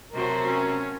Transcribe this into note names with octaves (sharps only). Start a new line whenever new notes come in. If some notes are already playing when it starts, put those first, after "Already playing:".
C3 F#3 A3 F#4 A#4 C5
C#4